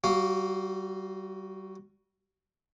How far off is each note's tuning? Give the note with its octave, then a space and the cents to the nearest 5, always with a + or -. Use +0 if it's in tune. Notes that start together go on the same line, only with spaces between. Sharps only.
G3 -30 F#4 +0 F5 +0